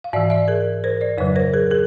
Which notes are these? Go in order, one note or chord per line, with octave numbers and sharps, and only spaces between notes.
F5
G#2 E3 D5 E5
D5 E5
G#4 A#4
A#4 C5
C5 D5
F2 C#3 F#3 B4 C#5
A#4 C5
G#4 A#4
G#4 A#4